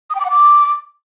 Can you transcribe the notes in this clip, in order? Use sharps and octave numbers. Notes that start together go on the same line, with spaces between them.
D#6
G5
D6
F#5
D6